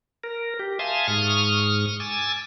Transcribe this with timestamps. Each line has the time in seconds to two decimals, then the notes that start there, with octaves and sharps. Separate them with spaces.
0.24 A#4
0.59 G4
0.79 E5 F5 G#5 A5 C6 D#6
1.08 G#2 C#6 D#6 F6
2.00 G#5 D6 E6 A6